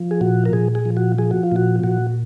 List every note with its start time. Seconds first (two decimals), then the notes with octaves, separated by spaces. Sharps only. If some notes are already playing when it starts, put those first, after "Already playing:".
Already playing: F3
0.11 G#4
0.21 A#2 F#4
0.46 A#4
0.53 A#2 G#4
0.75 G#4
0.85 F3
0.97 F#4
1.18 F3 G#4
1.31 F#4
1.43 F4
1.52 A#2 F#4
1.84 A#2 F#4